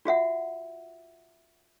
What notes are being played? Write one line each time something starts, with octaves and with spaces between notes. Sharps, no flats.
F4 F#4 E5 F#5